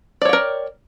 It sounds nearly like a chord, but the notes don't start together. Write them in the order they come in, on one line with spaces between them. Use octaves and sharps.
D5 C#5 G5 A#4